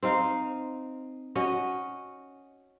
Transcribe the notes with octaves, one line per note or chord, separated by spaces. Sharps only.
C4 D#4 F5
C#4 F#4 D#5